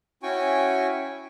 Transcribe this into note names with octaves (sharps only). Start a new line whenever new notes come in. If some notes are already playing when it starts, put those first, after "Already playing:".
C#4 E4 F#4 G5 G#5 C#6